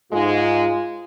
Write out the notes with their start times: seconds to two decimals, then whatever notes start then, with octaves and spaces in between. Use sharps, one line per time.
0.12 G#2 G#3 F4